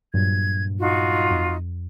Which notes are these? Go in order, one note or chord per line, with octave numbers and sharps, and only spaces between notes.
G2 A#2 F#3 G#6
D#4 F4 F#4
F2